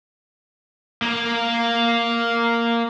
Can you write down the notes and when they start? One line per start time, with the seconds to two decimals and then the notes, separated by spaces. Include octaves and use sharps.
1.02 A#3 A#4